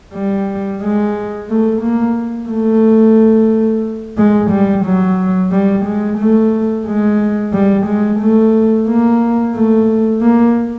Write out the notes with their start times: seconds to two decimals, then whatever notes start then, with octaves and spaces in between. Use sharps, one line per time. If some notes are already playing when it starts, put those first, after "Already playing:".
0.14 G3
0.81 G#3
1.49 A3
1.82 A#3
2.49 A3
4.18 G#3
4.51 G3
4.85 F#3
5.52 G3
5.86 G#3
6.19 A3
6.86 G#3
7.53 G3
7.87 G#3
8.20 A3
8.88 A#3
9.55 A3
10.22 A#3